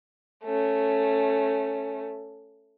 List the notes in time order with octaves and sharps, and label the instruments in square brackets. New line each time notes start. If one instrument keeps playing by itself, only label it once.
[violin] A3 C#4